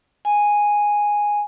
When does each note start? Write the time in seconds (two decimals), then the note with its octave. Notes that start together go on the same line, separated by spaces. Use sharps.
0.25 G#5